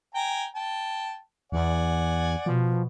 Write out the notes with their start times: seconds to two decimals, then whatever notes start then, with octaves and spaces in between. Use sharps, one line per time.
0.15 G5 G#5 A#5
0.55 G5 A5
1.52 E2 D5 F#5 G#5
2.46 B2 F3